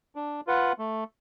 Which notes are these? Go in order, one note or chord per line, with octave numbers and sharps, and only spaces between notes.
D4
F4 B4 F#5
A3